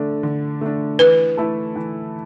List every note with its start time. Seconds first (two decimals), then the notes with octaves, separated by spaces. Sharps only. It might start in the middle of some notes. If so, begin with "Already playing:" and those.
Already playing: D3 A3 D4
0.23 D3
0.61 A3 D4
0.99 E3 B4
1.37 A3 E4 A4
1.76 E3